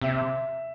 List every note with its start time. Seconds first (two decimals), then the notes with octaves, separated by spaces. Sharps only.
0.01 C3 E5